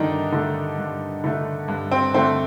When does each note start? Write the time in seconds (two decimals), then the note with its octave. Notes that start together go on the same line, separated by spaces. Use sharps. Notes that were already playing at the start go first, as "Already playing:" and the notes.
Already playing: G2 D3 D#3 A3 D4 D#4
0.32 D3 A3
0.78 G2
1.24 D3 A3
1.68 G2
1.91 C4
2.14 D3 A3 C4